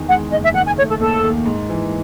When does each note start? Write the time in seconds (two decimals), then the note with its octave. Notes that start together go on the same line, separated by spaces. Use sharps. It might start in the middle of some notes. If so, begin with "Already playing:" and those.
Already playing: E2 D#3
0.08 G#3 F#5
0.31 F#1 D#5
0.43 E5
0.54 D#3 F#5
0.66 G#5
0.77 A3 C#5
0.88 A4
1.00 D#2 A4
1.23 D#2
1.46 G#2
1.69 E3